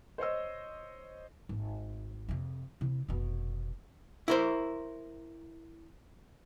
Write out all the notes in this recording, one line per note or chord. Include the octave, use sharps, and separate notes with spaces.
C5 C#5 D#5 E6
G#1
F2 C3
C3 E4
F1 B2
E4 A#4 C5